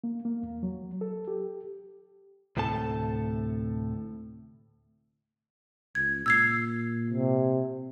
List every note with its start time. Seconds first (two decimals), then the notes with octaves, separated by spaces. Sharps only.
0.04 A#3
0.25 A#3
0.43 E2
0.63 F#3
1.01 A4
1.28 G4
2.57 D2 A2 C3 A4 A5
5.95 C#2 G#6
6.26 A#2 E6 G#6 C7
7.10 C3